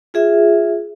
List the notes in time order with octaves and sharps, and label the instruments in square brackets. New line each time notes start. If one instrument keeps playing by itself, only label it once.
[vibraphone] F4 G#4 E5